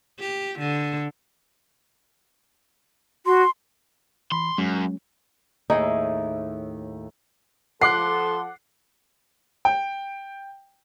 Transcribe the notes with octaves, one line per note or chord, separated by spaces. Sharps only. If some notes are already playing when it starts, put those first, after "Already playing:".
G4
D3
F#4 C6
E3 B5 C6
F#2 F#3 G#3 C#4
D#2 A2 D#4 E4 G#4 D#5
F3 A4 F#5 C6 D6 F#6 C7
G5